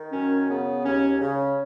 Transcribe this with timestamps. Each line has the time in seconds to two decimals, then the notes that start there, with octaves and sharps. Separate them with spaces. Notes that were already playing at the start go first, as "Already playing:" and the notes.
Already playing: D#3
0.13 F#2 C#4
0.49 C#3 B3
0.85 D#2 C#4
1.21 C#3 C#4